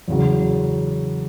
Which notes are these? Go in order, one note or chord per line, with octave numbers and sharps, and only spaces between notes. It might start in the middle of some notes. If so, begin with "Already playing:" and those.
E2 C#3 F#3